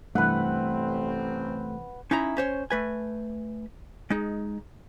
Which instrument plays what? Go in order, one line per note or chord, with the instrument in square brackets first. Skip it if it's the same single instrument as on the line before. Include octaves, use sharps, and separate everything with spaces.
[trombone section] A1 C4 [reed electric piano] G2 C3 E3 [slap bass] A3 [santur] B4 F#5
[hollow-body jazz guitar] C#4 D#4 E4 A#5
C#4 C5 C#5
A3 B4 G#5
G#3 D#4